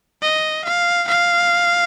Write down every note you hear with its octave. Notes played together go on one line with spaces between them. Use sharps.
D#5
F5
F5